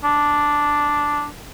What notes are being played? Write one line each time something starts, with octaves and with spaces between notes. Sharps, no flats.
D4